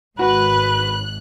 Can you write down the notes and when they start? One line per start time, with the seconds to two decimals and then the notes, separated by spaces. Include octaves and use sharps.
0.19 G#1 G#2 F#4 B4 F#6